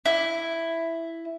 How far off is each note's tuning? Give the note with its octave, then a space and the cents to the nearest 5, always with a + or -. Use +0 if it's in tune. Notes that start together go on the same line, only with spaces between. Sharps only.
E4 +5